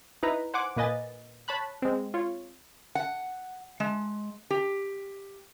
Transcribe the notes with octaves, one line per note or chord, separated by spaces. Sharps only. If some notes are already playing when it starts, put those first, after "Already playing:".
D#4 E4 B4 A#5
C5 F#5 G#5 D6
A#2 A#3 B4 D#5 G#5 A6
C#5 A5 B5 F#6
G#3 C4
F4 C#5
F#5
G#3
G4